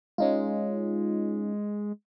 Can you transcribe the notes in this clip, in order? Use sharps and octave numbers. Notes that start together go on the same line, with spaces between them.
G#3 C#4 D#4 F4